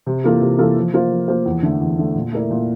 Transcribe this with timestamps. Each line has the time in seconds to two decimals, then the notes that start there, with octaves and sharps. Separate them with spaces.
0.06 C3
0.24 E3 A#3 F4 A4
0.41 C3
0.58 E3 A#3 F4 A4
0.76 F3
0.94 A#3 F4 C5
1.11 F3
1.28 A#3 F4 C5
1.45 E2
1.63 D3 A3
1.80 E2
1.98 D3 A3
2.15 A#2
2.32 A3 E4 A#4 D5
2.50 A#2